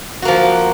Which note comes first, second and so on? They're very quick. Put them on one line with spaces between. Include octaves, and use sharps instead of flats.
F#4 A#3 F3